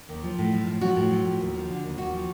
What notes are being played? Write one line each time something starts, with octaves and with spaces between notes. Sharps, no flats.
D#2
F3
A2
F3
A2
F3 F#4
A2
F3
A2
D#2
F3
D3
D#2
D#2 F#4
F3